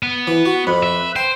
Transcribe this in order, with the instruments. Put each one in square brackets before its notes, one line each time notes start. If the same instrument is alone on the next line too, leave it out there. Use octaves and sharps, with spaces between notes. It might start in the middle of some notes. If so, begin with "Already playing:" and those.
[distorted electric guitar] B3
[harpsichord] E3
F#4
[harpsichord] F2 [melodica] B4 B5
[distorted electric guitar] E5
[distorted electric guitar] C5 [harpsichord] G5